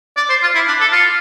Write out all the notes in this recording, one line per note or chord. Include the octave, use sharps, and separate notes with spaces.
D5
C5
F4
E4
D4
A4
F4